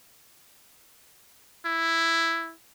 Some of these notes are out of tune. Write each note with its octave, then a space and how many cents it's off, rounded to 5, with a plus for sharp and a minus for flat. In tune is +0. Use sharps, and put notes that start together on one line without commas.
E4 +5